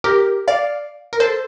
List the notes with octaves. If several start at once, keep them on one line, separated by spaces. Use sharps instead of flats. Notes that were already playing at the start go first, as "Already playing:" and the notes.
G4 A#4
D5 F5
A#4
A4 C5